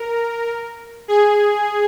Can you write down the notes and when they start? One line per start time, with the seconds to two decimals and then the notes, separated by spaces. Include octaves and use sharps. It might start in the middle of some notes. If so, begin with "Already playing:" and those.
Already playing: A#4
1.08 G#4